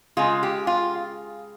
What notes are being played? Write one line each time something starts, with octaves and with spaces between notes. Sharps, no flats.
C#3 G#3 F4
G4
F4